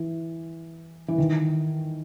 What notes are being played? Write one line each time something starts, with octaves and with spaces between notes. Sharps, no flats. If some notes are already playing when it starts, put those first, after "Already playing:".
Already playing: E3
E3
D#3